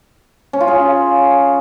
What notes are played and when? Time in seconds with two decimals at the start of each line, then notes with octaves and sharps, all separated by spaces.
0.53 C#4
0.61 F4
0.68 G#4